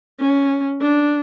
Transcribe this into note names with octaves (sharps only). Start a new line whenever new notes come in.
C#4
D4